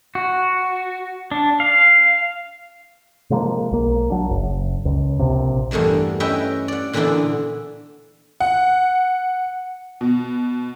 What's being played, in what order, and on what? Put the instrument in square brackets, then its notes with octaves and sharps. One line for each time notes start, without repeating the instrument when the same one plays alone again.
[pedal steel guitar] F#4
D4
F5
[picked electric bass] C3 F3 G#3 A#3
B1 A#3
F#3 D4
F#1
C#2
A#1 C3
[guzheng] E2 G2 A3 A#3 D4
C#4 E4 B4 D#5 E5 G5
D5 F#5
A#2 D3 E3 B3 D4 E4
[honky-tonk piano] F#5
B2